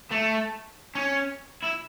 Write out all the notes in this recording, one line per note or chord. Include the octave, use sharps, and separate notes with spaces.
A3
C#4
E4